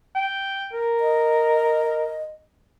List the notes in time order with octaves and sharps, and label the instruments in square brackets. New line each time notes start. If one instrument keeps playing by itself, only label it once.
[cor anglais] G5
A#4
[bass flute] D#5